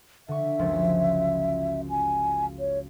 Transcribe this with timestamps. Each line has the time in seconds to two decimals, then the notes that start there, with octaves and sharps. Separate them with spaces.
0.28 D3 E5 C#6
0.59 F#1 C#2 F3
1.90 G#5
2.59 C#5